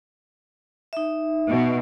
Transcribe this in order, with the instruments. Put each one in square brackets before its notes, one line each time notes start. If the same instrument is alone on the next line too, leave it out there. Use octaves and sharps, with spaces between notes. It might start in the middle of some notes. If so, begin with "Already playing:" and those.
[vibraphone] D#4 E5
[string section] B2